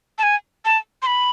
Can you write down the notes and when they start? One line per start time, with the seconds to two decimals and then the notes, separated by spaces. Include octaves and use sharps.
0.18 A5
0.23 G#5
0.65 A5
1.02 C6
1.07 B5